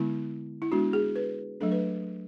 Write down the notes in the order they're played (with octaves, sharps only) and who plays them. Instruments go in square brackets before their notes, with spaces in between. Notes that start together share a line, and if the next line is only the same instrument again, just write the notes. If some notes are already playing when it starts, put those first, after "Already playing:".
Already playing: [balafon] D3 G#3 B3 E4
E4
G#3 B3 D4 F#4
G#4
B4
F#3 A3 D4 A4
B4